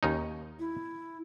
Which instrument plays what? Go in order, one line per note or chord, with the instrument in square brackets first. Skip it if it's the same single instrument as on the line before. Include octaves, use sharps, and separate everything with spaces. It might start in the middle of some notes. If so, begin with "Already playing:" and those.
[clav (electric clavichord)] D#2 C#4 D#4
[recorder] E4